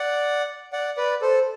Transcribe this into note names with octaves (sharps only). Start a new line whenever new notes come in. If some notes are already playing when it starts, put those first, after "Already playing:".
Already playing: D5 F#5
D5 F#5
B4 D5
A4 C5